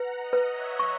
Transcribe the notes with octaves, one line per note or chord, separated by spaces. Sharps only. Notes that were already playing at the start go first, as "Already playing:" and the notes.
Already playing: B4 F#5 A#5
D#5 F#5
B4
C#5 E5
C#6